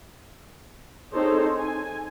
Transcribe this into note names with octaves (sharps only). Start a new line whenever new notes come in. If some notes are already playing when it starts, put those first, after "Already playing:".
C4 D#4 G#4 A4 C5 C#5
G#5